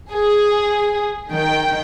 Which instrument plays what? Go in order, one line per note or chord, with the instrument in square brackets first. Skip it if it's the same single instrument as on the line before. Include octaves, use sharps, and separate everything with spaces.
[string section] G#4
D#3 G5